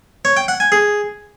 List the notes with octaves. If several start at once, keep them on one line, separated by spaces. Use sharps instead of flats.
C#5
G5
F#5
G#5
G#4